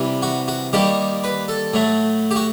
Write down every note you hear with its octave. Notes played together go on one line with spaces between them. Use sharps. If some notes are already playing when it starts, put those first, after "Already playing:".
Already playing: C3 E3 G3
F#4
F#4
D#3 G3 A#3 G4
B4
A4
A2 F#3 A3
G4
F#4